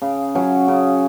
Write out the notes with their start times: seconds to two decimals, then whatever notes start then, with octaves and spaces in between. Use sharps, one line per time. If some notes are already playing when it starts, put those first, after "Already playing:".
0.02 C#3
0.35 F#3 C#4
0.68 C#3